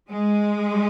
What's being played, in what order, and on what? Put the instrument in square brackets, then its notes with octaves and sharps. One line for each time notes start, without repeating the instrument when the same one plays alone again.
[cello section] G#3